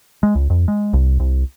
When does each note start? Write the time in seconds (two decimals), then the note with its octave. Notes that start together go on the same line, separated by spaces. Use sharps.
0.23 G#3
0.35 C#2
0.50 F2
0.68 G#3
0.93 C2
1.20 C2